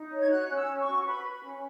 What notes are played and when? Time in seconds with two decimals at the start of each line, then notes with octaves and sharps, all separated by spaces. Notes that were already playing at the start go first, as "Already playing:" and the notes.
Already playing: D#4
0.11 C#5
0.20 G#6
0.29 F#4 F#6
0.48 C#4 F#6
0.54 E6
0.67 C#4
0.80 C#6
0.86 F#4
1.05 B4 B5
1.24 B4
1.31 B5
1.43 C#4